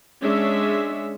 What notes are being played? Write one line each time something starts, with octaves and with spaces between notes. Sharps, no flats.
G#3 C#4 D4 E5